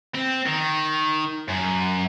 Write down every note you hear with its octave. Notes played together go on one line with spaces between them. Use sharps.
C4
D#3
F#2